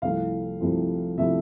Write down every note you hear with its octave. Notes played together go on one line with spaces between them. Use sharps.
C2 C3 F3 A3 E4 F5
C2 C3 F3 A3 E4
C3 F3 A3 E4 E5